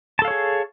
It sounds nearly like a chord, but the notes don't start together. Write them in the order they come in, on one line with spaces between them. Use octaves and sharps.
A5 A4 F5 C#5 G#4